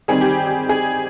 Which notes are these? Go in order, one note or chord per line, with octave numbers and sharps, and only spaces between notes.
D#3 G3 C4 G#4
G4
G4
G#4